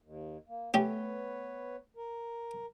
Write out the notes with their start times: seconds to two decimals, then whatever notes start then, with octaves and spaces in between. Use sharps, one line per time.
0.02 D#2
0.48 A#3
0.74 A3 B3 C#4 G4 B4 C#5
1.97 A#4